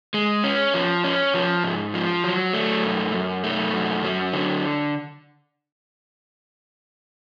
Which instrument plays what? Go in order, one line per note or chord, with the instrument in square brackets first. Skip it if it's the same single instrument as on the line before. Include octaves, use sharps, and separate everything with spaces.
[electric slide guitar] G#3
C#4
F3
C#4
F3
G#2
F3
F#3
A3
F#2
F#2
A3
F#2
F#3
D3